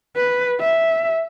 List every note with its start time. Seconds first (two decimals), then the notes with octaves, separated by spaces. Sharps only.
0.16 B4
0.60 E5